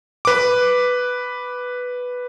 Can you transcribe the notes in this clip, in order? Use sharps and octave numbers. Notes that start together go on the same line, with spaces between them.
B4 D6